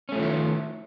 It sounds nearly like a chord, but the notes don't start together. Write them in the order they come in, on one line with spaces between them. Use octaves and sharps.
C#4 A3 F3 D#3 E4